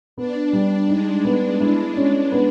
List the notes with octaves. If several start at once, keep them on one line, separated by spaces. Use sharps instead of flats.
B3 D4
G3
G#3 D#4
B3
E4
C#4
B3